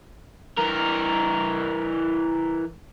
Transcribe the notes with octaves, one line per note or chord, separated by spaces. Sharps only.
E3 A#4